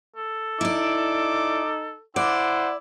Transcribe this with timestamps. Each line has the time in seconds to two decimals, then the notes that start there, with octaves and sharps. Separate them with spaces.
0.16 A4
0.61 D#4 E4 D5 D6
2.16 E4 C5 D5 F#5